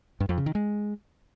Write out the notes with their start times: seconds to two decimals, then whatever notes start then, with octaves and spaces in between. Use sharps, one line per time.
0.20 G2
0.29 F2
0.38 C#3
0.46 D#3
0.55 G#3